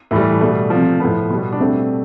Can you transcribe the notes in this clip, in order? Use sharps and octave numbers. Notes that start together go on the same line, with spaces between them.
A2 E3 G3 A3
B2 G3 A3
C3 F3
A2 F3 B3
B2 G3
D4
B2 G3 A3 C4